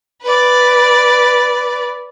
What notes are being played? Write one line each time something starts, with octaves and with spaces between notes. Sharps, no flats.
B4 D5